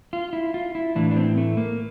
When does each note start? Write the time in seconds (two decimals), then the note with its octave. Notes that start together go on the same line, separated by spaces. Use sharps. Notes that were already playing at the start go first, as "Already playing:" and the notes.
0.13 F4
0.33 E4
0.54 F4
0.75 E4
0.95 A2 E3 D4
1.11 D4
1.16 C4
1.38 A3
1.57 A#3